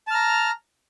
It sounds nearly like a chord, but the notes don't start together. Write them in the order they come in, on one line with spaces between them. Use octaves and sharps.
A5 F6 A#5